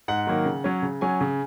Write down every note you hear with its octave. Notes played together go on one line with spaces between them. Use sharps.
G#2 F#5
D#3 F#3 A#3
C#3
F#3 C#4
C#3
F#3 C#4 G#5
C#3